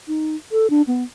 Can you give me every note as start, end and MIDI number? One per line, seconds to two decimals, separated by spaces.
0.08 0.36 63
0.52 0.70 69
0.70 0.82 62
0.87 1.03 59